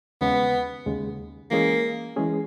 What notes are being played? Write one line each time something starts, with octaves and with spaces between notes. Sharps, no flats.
D#2 C#3 G#3 B3
D#2 C#3 G#3
E3 G#3 A#3 C#4 G#4
E3 G#3 C#4 G#4